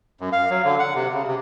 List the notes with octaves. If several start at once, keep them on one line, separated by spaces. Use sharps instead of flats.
F#2
F5
F#3
D3
F#5
C3
C#3
C3